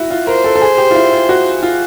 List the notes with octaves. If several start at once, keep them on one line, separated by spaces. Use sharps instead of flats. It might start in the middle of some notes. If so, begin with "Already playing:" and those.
Already playing: E4 F#4
F4
A#4 C5
A4
A4
G#4
G4
F4
E4
F4
F#4
F4